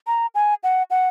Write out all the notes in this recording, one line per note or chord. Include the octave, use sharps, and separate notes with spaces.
A#5
G#5
F#5
F#5